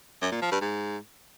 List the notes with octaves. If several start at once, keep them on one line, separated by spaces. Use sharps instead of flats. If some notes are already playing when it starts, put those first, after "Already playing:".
F#2
A#2
F3
G2
G#2